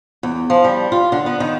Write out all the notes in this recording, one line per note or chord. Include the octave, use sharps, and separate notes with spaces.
E2
F3
G3
F4
D3
B3
D#3